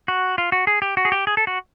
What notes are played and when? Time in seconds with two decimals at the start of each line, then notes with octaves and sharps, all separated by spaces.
0.08 F#4
0.38 F4
0.52 F#4
0.67 G#4
0.82 G4
0.97 F#4
1.05 G#4
1.12 G4
1.27 G#4
1.37 A4
1.47 F#4